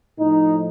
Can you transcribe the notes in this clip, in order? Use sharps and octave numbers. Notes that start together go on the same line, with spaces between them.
A2 F3 D#4